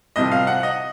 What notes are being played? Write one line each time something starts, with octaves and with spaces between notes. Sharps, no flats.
C2 C3 F3 D#5
F5
F#5
D#5